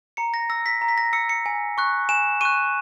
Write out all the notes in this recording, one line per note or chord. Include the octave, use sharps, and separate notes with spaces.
A#5 C#7
A#6
E6 A#6
B6
A#5
B6
A#6
E6 C#7
C#7
G#5
C#6 F#6
G#5 E7
C#6 F#6 D#7